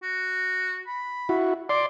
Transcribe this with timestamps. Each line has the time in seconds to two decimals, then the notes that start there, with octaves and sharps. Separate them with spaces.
0.03 F#4
0.87 B5
1.29 E4 F#4
1.69 D5 C6 D6